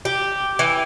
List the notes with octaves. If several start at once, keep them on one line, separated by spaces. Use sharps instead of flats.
G4
E3